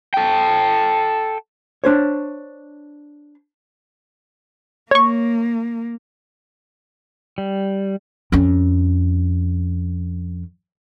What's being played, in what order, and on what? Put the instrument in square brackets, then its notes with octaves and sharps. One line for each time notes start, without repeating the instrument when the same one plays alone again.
[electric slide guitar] A4 G5
[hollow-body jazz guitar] D4 C5 C#5
[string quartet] A#3 [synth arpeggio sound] C#5 C#6
[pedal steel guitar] G3
[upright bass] F2 C#4